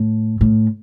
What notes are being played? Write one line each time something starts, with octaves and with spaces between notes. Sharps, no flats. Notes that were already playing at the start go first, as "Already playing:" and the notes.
Already playing: A2
A2